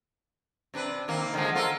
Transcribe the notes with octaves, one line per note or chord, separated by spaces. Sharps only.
C3 D4 B4
C3 D#3 A#3
D3 F3 G#3
F4 A4 A#4